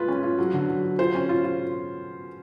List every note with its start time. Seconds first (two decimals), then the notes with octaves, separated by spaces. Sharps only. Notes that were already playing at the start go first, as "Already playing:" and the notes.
Already playing: G#3 F4 B4
0.08 C#4
0.23 F4
0.38 F#3
0.54 D3
0.69 F#3
0.84 F#3
0.99 F4 C5
1.15 C#4
1.29 F4
1.44 F4